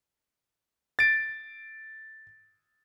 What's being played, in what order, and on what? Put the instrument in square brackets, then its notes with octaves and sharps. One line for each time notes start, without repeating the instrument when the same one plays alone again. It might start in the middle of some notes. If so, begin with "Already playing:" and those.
[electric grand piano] A6 D7